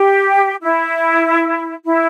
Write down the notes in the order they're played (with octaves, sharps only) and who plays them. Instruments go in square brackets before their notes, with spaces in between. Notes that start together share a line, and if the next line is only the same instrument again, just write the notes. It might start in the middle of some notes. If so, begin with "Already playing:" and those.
Already playing: [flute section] G4
E4
E4